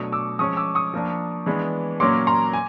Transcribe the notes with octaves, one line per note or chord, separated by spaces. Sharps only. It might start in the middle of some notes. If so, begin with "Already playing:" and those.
Already playing: B2 F#3 A3 D4 C#6 D#6
D6 E6
F3 G#3 C#4 C#6 D#6
D6 E6
C#6 D#6
F3 A#3 D4
E3 G#3 B3 D4
A#2 F#3 A#3 C#4 C6 D6
A#5 C6
G#5